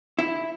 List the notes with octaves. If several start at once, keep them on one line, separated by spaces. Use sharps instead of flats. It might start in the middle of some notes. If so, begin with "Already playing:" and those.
E4